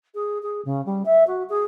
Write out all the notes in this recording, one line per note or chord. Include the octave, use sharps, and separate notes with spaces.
G#4
G#4
C#3
G3
E5
F#4
G#4